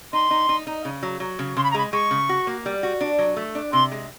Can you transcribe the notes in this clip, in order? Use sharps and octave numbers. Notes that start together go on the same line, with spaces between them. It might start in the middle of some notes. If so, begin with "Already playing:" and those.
D#4 C6
D#4
D#4
D#4
C#3
F#3
F#3
C#3
C#3 C6
B5
A#5
G#3 B5
G#3 C#6
C#3
F#4
A#3
G3
F#4
D4
F#3
A3
D4
C3 C6
G#3